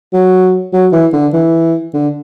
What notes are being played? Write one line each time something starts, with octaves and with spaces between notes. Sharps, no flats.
F#3
F#3
E3
D3
E3
D3